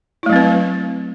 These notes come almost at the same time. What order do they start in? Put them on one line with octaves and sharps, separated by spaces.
E4 A3 F#3 C4 B4